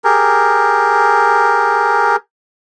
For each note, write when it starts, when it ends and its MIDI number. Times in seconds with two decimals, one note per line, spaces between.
0.04 2.16 67
0.04 2.16 68
0.04 2.16 70